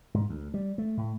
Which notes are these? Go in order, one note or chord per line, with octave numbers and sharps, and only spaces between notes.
G#2
D2
G3
A3
A2